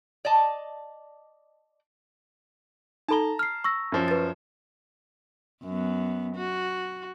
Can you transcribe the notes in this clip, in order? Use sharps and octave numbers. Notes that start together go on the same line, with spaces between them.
D5 D#5 A5
D#4 A4 A5 A#5 G7
F6 C7
C#6 E6 A#6
F#2 F3 C#4
B4 A6
F#2 B3
F#4